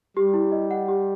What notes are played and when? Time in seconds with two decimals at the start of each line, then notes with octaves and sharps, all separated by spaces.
0.16 G3 G4
0.34 E4
0.52 D#5
0.71 F#5
0.88 G4